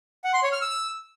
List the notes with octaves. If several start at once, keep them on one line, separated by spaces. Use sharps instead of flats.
F#5
C6
C#5
F6
E6